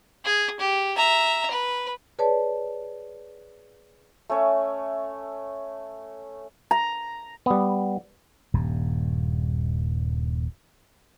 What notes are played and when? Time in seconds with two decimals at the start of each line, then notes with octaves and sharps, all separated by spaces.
0.24 G#4
0.60 G4
0.96 E5 A#5
1.51 B4
2.19 G#4 B4 C#5 D5 A5
4.30 A3 C#4 C#5 E5
6.71 A#5
7.46 G3 B3
8.54 D#1 G2